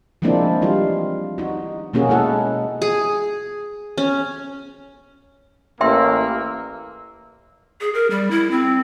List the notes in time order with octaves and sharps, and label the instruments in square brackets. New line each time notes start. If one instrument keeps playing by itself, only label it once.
[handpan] F3 G#3 A#3 C4 D4 E4
E3 G3 F4
D#4 F#4
B2 A#3 C#4 F#4 G#4
G#3 A#3 E4 A4 F#5
[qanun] G#4
C#4
[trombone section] A1 [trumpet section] A#3 [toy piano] E5 G5 C6 [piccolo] E6
[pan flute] G#4
A#4
G3
E4
C4